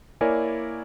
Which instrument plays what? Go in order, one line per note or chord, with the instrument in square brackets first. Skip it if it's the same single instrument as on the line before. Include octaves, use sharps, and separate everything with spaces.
[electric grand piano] A#3 E4 A#4 C#5 D5 G#5